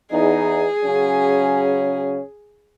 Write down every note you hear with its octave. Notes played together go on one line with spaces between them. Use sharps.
E2 D#4 G#4
C#3 F#3 C#4